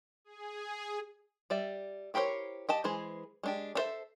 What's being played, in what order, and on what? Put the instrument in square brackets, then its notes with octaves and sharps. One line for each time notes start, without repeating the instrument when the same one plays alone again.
[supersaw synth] G#4
[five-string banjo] G3 D5 E5
E4 G4 A#4 C5 C#5
G4 D#5 A5
E3 G#3 G#4 C5
G#3 D4 G4
D4 A4 C5 E5